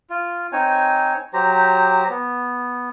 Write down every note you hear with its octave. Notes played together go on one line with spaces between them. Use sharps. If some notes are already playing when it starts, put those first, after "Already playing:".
F4
C4 D#4 C#5 G#5
F#3 G4 C5 A#5
B3